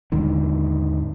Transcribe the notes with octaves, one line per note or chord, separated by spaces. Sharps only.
D#2 G#2 D3 D#3